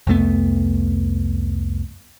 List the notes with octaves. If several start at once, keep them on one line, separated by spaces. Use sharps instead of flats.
C2 F2 A3 B3